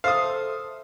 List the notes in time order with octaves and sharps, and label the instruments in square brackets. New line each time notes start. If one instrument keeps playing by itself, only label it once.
[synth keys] A4 C5 E5 [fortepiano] F5 D#6